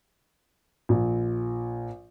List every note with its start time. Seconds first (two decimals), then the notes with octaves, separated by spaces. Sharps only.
0.89 A#1